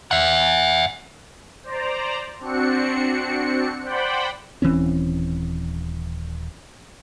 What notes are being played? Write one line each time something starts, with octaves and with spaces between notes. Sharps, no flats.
E5 F#5
C5 D5 A#5
C4 D4 F#4 C#7
C5 D5 F#5 G5 B5
D#1 E3 C4 C#4